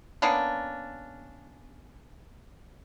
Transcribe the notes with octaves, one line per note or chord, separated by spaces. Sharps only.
A#3 B3 C#4 D4